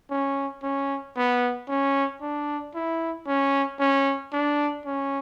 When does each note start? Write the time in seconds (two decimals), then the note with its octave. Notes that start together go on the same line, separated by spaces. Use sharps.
0.10 C#4
0.63 C#4
1.16 B3
1.68 C#4
2.21 D4
2.75 E4
3.27 C#4
3.80 C#4
4.33 D4
4.85 C#4